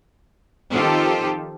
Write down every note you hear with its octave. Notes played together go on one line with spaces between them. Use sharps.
D#3 F3 C4 F4 G4 A4